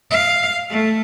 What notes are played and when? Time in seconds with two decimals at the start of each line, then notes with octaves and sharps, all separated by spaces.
0.11 F5
0.70 A3